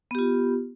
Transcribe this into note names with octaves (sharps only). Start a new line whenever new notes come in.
B3 F4 G4